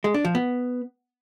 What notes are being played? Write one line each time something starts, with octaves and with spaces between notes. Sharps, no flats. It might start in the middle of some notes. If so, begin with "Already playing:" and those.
G#3
D4
F3
B3